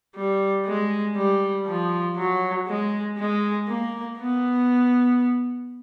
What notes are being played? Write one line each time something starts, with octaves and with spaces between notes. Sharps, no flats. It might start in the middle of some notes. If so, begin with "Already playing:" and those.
G3
G#3
G3
F3
F#3
G#3
G#3
A#3
B3